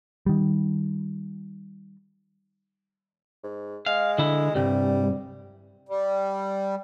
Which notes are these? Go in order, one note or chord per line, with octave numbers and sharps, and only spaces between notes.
D#3 G3
G#2
G#3 F5
D3 E4
C2 G2 G3
G3